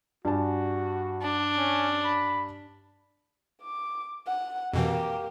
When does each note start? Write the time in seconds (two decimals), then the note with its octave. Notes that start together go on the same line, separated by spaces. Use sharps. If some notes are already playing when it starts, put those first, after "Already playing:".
0.25 G2 F#4 G#5 A5
1.22 D4
1.57 C#4
2.05 B5
3.62 D6
4.26 F#5
4.73 F2 B2 E3 A#3 G4